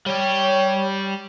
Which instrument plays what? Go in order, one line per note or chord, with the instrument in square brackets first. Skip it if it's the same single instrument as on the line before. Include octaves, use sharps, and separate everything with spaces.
[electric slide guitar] G3 G4 [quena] C#5